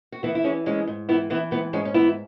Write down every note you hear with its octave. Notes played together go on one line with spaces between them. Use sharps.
F#4
E3 B3 E4
E4
E3 G#3 C#4
G#2 G#3 C#4
G#2
E3 B3 E4
E3 B3 E4
G#2 B3 E4
G#2 G#3 C#4
C#4
E3 B3 E4